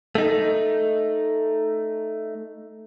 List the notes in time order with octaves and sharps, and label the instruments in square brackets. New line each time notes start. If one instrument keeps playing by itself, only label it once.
[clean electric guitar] A3 D#4